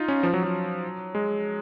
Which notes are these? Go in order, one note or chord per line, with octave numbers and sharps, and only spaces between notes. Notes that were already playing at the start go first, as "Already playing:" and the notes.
Already playing: D#4 F4
C#4
F3
F#3
F#3
G#3